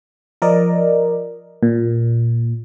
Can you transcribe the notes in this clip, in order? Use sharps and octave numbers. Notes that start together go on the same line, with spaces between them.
F3 A#4 D5 D#5
A#2